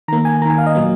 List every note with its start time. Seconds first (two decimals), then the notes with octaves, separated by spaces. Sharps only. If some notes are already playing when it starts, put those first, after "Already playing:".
0.08 D#3 A#5
0.13 A#3
0.25 G#5
0.42 A#3 A#5
0.45 D#3 G#5
0.58 F5
0.66 D#5
0.75 A#2 F#3 A#3